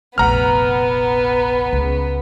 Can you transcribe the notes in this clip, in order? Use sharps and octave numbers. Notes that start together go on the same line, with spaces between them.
F1 A#1 B3 F#5 A#5 F6
C#2